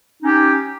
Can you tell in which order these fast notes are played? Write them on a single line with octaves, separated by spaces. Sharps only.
D#4 C#4 G4